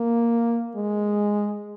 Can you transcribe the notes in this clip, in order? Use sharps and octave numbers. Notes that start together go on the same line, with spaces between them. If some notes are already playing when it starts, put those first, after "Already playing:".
Already playing: A#3
G#3